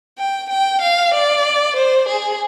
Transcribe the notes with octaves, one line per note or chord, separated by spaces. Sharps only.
G5
G5
F5
D5
C5
G#4